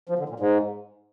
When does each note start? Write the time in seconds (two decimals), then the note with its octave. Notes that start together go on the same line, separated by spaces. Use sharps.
0.09 F3
0.19 D3
0.29 A#2
0.40 G#2